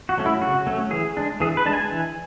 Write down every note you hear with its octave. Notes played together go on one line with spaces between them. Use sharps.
F#4
F#3 A3 C#4
E4
C#3 F#4
F#3 A3 C#4
E3 G#4
G#3 D4
E3 G#4
B4
G#3 D4 A5
G#5
E3